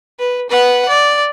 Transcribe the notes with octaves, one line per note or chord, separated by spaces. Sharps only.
B4
B4 F#5
D5